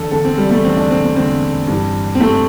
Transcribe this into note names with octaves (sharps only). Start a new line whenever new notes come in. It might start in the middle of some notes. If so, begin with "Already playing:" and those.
Already playing: E2 D3 D4 A4
E2 D3 A4
C4
G3
A3
E2 D3 C4
D4
C4
C4
E2 D3 C4
G2 E3
C4
G2 E3 A3